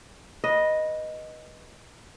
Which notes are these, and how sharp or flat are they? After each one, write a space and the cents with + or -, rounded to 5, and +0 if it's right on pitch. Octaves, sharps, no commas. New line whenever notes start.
B4 -20 D#5 +0